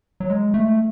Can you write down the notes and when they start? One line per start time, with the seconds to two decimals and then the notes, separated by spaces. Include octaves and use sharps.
0.20 F#3
0.30 G#3
0.54 A3